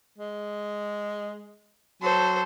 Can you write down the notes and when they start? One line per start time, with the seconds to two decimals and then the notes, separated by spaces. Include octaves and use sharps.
0.18 G#3
2.02 F#3 A4 C5